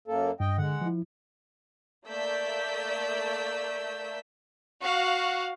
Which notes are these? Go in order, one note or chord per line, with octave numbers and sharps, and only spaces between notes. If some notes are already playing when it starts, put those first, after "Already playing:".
F#2 A#3 A4
G2 D#5 G5
D3 G#3 F#5
F3 E4
A3 A#3 D5 E6 G6 B6
F#4 F5